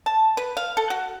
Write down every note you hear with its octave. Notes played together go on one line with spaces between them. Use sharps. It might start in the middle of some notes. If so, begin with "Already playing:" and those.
A5
B4
F5
A4
F#4